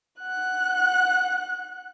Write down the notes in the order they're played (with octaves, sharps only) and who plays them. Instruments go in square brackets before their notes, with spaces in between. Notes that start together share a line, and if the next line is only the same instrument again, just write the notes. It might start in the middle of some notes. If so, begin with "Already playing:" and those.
[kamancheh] F#5 F#6